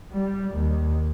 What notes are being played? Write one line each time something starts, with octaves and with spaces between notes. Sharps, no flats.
G3
D#2